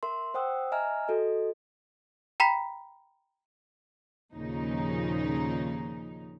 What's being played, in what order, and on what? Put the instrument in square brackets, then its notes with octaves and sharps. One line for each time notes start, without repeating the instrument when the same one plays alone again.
[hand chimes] A#4 E5 C6
C5 F#5 G5 D#6 E6 F#6
D#5 E5 G#5 A#5 F6
F#4 A4 D#5
[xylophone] G5 A#5 B5 B6
[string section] D#2 A#2 C#3 F3 D#4